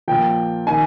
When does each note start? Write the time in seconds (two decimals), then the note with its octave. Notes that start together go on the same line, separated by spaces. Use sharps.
0.08 A#2 F3 G5
0.67 D#3 G#5